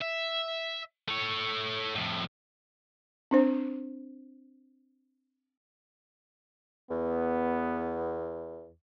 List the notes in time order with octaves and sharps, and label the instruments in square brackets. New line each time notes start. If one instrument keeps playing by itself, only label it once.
[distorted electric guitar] E5
A3 C#5
F2 A2
[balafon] C4 D4 C5
[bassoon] E2 [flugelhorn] B3